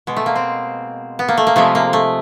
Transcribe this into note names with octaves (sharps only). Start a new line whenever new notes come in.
B2 G#3
A3
A#3
C4
B3
A#3
A3
A#3
C3 F3 G#3 A3
A#3
A3